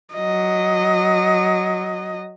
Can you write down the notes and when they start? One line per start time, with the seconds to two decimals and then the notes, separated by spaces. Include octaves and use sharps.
0.14 F#3 D#5